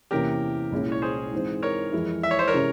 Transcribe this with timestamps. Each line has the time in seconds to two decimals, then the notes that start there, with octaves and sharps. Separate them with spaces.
0.11 E2 C3 E3 A#3 C#4 G4 A#4
0.72 C2 A#2 G#3 C#4 E4
0.92 C#5
1.02 G#4 C5
1.32 G#2 E3 G#3 C4
1.63 A#4 C#5
1.92 F2 E3 G#3 E4
2.23 E5
2.31 C#5
2.39 C5
2.48 A#4 C#5
2.54 C3 E3 G#3 C#4